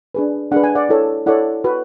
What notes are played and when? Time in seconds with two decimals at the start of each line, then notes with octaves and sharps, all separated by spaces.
0.15 D4 G#4 B4
0.52 D4 G#4 B4 F#5
0.64 G#5
0.75 D5 F#5
0.89 E4 A4 C#5
1.26 E4 A4 C#5 D5 F#5
1.64 F#4 B4